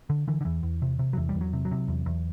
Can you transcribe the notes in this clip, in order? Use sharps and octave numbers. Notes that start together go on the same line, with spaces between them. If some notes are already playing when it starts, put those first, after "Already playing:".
D3
D3 E3
D3
E2 E3
E2
C3
C3
F#3
E2 E3
G3
E2
F#3
C3
F#3
C3
E2
E2